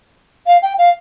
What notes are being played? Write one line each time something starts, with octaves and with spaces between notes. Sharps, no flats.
F5
G5
F5